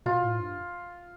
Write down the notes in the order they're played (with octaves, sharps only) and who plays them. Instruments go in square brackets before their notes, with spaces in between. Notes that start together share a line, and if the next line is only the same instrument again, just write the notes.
[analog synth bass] B2 [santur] F4
[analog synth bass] A2
G2